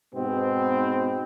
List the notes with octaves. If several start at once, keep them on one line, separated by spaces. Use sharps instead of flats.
G#2 B2 B3 C4